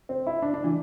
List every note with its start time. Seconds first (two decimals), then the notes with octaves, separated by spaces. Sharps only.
0.09 C4
0.27 E4
0.42 D4
0.54 D4
0.64 E3